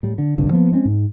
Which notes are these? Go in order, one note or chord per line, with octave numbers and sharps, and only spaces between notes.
A2 G3
D3
G1 C2 G2 D3
F3 A#3 B3
G#3 C4 C#4
G#2